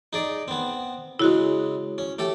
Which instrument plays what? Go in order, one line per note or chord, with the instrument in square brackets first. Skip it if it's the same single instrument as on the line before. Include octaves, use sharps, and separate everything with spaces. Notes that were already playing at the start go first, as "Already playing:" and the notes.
[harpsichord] D#4 G#4 D5
B3 C4
[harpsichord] C#3 G#3 [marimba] E4 F#4
[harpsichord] C#4
A3 G4 A4